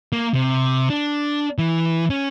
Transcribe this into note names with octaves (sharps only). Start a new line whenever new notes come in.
A#3
C3
D4
E3
C#4